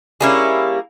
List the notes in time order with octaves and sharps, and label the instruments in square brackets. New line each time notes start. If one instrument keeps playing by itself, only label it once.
[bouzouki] G3 A#3 E4 [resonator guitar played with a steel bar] C#4 G#4